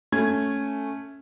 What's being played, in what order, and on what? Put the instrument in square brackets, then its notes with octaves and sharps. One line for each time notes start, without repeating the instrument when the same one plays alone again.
[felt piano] A3 C#4 G#6